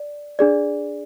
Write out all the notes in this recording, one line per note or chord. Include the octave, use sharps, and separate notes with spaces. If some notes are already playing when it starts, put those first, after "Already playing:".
Already playing: D5
D4 G#4 D5